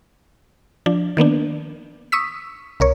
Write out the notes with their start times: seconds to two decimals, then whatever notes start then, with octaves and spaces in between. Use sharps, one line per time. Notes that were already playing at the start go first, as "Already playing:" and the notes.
0.86 F3 D4
1.17 D#3 A#3 B3 D4
2.12 C#6 D#6 E6 B6
2.80 C2 A#4 C#5